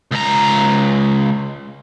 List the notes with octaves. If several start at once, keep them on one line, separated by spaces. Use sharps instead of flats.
C#2 A#5